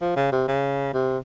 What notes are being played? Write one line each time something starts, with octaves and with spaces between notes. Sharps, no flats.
F3
C#3
C3
C#3
C3